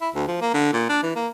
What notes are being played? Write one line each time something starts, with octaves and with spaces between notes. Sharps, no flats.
E4
D2
F3
A#3
D3
A#2
D4
E3
A#3